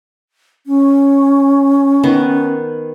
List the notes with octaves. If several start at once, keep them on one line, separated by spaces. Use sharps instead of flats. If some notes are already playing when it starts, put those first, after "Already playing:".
C#4
D#3 B3